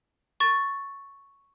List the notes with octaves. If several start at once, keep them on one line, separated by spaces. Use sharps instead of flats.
C#6 A6